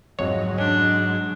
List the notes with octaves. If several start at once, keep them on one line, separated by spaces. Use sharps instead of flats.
F2 G#2 F#3 C#5 D#5
C#4 D4